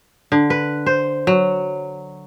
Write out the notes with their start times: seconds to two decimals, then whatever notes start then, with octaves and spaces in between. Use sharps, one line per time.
0.32 D3
0.50 B4
0.86 C5
1.27 F#3